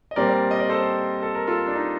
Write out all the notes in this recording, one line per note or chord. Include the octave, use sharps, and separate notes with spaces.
D#5
A#2 G3 C4 A#4 D5
D#5
D5
A4 C5
A4
A#4
F4 A4
D4
D#4